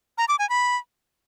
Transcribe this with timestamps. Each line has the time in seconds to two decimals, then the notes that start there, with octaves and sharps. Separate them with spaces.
0.18 A#5
0.28 D6
0.39 G#5
0.49 B5